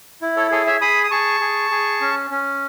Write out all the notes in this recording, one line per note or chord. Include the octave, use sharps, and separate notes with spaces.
E4
A4 C#5
G#4 A4 C#5
C#5 E5
G#4 B5 D#6
D#6
G#4 A5 C#6
G#4
G#4
C#4
C#4